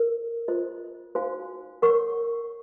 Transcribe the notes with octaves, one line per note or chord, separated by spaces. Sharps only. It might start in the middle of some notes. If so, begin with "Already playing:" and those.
Already playing: A#4
F4 C5 D#5
D#4 F#4 C5 F5 G#5
A#4 C#5 F#5 C#6